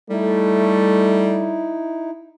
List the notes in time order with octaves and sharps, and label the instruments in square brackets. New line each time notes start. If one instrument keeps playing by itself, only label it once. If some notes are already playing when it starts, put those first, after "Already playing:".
[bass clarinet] G3 [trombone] A3 [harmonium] D#4 E4